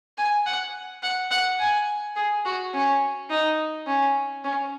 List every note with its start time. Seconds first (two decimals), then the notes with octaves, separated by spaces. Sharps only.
0.18 G#5
0.46 F#5
1.03 F#5
1.31 F#5
1.60 G#5
2.16 G#4
2.45 F#4
2.74 C#4
3.30 D#4
3.87 C#4
4.44 C#4